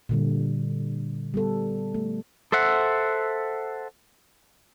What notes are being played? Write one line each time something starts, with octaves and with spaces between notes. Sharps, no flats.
A#2 D3 G3
G3 B3 A4
A3
A4 C5 E5 F#5